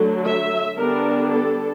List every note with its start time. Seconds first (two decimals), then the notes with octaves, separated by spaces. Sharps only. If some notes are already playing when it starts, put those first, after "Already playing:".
Already playing: D3 F#3 A3
0.25 E5
0.77 D3 G3 B3 D4 A#4
1.30 A4